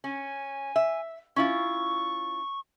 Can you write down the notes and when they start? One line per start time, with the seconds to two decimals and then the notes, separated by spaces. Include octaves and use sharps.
0.04 C#4 G#5
0.76 E5
1.36 C#4 E4 F4 C#6